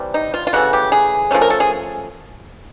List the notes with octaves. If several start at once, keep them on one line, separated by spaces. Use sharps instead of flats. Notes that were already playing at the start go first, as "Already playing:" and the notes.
Already playing: C3 E3 G3
D#4
F4
F4
C#3 E3 A3 F#4
G4
G#4
F3 A3 C#4
A#4
A4
G#4